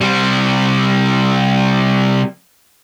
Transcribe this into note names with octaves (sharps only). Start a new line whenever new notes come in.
C3 G3